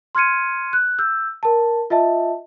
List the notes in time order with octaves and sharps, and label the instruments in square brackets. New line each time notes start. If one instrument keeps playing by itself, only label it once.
[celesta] C6 F6 G#6 C#7 D#7
F#6
E6 G6
A#4 A5
F4 D#5 E5 A5